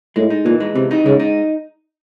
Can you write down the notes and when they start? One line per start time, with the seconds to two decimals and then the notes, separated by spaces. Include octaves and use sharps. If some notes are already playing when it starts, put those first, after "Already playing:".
0.16 A2 G#3
0.30 D#4
0.45 A#2 E3
0.60 G#3
0.75 C3 E3
0.91 D#4
1.05 C#3 G#3
1.20 D#4